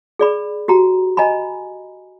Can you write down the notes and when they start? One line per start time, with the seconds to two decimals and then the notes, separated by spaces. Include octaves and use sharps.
0.19 G#4 D5 B5
0.68 F#4 G4 A#5
1.17 D#5 G#5 A#5 B5